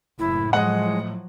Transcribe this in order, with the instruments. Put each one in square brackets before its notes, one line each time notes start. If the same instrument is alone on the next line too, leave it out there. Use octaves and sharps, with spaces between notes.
[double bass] F#1 [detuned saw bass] A2 [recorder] E4
[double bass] F3 F#3 [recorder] G#3 [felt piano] D#5 F#5